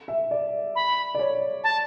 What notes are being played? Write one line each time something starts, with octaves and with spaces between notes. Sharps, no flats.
E5
D5
B5
D5
C#5
A5